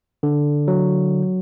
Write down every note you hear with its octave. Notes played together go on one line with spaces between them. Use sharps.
D3
F#3